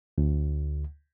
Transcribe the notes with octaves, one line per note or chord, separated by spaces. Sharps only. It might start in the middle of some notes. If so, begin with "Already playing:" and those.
D2